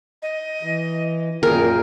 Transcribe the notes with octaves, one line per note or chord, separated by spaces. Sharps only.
D#5
E3
F#2 A#2 G#4 A#4 G5